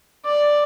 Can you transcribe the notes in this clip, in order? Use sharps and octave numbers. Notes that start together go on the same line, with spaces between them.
D5